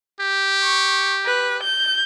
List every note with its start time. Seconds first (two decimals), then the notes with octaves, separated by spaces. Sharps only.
0.21 G4
0.63 C#6
1.25 B4
1.63 G6